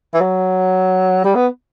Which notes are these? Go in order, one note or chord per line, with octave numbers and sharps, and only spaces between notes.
E3
F#3
G3
B3